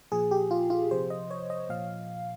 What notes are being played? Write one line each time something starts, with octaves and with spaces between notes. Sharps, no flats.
A#2 F3 G#4
G4
F4
F4
C3 F3 C5
D#5
C#5
D#5
A#2 F3 F5